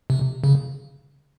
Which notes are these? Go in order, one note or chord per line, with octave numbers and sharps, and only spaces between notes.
C3
C#3